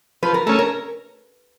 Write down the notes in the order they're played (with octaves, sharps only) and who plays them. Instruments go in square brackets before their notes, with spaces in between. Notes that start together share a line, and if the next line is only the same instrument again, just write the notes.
[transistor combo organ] F3 [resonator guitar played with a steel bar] B4
[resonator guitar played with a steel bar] A#4
[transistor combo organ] A3 C#4 [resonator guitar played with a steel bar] A#4
[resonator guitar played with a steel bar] A#4